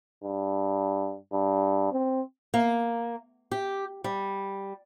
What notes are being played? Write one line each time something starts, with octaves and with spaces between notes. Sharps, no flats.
G2
G2
C4
A#3
G4
G3